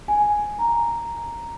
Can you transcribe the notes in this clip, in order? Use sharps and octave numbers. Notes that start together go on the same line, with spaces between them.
G#5
A#5